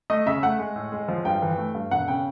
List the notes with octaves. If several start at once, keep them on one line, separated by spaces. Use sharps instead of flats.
A3 D#5
C#3 E5
A3 F#5
G#3
A2
G#3
F3
G2 G5
E3
A3
G2
E1 F#5
C#3 G5